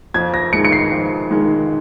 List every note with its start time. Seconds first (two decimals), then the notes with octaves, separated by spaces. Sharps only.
0.14 F2 G#6
0.34 A#6
0.53 D#3 G#3 C#7
0.65 C#7
0.72 C7
0.92 F2
1.31 D#3 G#3